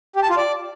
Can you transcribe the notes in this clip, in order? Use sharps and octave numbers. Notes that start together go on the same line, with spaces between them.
G4
A5
F4
D5